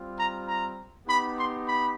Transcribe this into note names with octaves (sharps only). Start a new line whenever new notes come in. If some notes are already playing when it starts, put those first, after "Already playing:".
Already playing: G3 C4 F4
A#5
A#5
B3 D#4 G4 B5
C6
B5